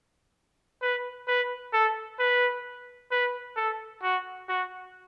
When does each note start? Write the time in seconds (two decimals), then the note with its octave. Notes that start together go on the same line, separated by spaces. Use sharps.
0.82 B4
1.28 B4
1.73 A4
2.19 B4
3.11 B4
3.56 A4
4.02 F#4
4.49 F#4